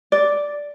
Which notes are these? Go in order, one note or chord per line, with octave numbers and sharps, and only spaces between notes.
D5